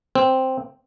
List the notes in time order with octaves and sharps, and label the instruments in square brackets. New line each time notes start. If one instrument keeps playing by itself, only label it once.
[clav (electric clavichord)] C4